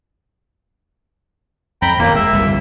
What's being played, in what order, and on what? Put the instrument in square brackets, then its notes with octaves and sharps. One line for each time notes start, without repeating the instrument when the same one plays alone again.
[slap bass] F2 [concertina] G5 A#5 B5
[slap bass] E1 D#2 [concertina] A#3
[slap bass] G#3 [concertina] E5
[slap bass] G1 C2 C#3